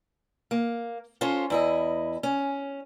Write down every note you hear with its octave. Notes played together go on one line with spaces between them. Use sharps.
A#3
C#4 F4 A4 C5
E2 E4 D#5
C#4